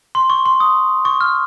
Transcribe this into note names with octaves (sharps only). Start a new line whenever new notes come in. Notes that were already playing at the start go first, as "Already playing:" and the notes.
C6
C#6
C6
D#6
C#6
F6